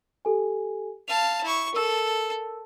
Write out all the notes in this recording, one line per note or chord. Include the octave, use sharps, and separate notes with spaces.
G4 A4 G#5
F5 A5 F7
E4 C#6
A4 A#4 E6